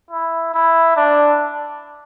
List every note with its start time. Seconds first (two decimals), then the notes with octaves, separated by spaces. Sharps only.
0.11 E4
0.54 E4
0.97 D4